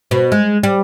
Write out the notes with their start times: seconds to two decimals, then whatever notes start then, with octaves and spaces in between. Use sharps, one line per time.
0.11 B2
0.32 G#3
0.63 G3